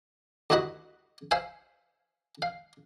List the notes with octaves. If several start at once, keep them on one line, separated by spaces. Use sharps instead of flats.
D2 G2 E4 F#4 D#5 B5
C5 E5 F5 G#5
F5